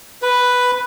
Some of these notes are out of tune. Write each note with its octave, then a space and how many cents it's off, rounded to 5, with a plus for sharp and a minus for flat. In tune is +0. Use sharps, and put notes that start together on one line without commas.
B4 +0